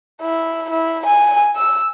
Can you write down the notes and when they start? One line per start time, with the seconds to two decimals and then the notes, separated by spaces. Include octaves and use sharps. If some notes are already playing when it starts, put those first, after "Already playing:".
0.21 E4
0.70 E4
1.06 G#5
1.56 E6